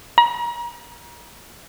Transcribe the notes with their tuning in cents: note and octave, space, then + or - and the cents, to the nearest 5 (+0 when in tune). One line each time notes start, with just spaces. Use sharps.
A#5 +35